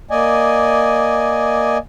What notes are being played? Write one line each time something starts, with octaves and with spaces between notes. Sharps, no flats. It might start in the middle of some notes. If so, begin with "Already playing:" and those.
A#3 D5 D#5 G#5